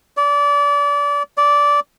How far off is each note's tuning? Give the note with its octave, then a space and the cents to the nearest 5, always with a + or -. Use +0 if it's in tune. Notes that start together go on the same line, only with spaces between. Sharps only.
D5 -30
D5 -15